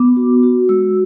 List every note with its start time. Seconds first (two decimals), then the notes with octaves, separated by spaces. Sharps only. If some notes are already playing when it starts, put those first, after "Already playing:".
Already playing: B3 D6
0.17 F#4
0.43 F#4
0.69 G#3 E6